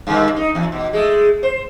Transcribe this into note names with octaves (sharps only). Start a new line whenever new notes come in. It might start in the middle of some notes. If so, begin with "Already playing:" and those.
G2 D#3
D#4
E2
B2
G#3 A3
C5